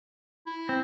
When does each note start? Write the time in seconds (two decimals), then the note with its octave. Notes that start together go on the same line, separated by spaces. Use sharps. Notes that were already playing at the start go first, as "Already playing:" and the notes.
0.47 E4
0.69 C4